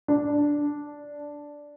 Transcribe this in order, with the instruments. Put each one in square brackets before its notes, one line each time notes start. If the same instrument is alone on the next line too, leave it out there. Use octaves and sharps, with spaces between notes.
[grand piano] D4